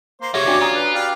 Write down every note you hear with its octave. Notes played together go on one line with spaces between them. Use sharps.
A#3 C5 C6
C3 F3 G4 G#4 C#5 E5
D#2 C#4 D4 F#4 D5
F4 G#5 A#5 D#6
B4
G4 D5 F5